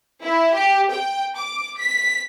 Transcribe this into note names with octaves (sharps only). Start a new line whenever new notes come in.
E4
G4
G5
D6
B6